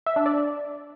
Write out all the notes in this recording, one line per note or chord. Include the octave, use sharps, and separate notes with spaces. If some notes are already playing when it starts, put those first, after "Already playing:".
E5
D4
D5